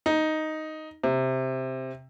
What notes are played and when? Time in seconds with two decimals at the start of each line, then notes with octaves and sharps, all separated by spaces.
0.06 D#4
1.04 C3